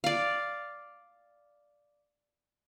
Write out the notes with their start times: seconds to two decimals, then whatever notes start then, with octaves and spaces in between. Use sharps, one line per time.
0.04 D5 F5